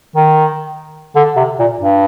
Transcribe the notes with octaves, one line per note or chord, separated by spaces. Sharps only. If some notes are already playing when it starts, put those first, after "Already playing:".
D#3
D3
C3
A#2
G2